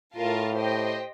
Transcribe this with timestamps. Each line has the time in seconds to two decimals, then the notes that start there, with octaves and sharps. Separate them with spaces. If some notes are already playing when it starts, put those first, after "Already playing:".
0.16 A2 F4 A#4 F5 A5
0.57 G4 C5 D#5 G5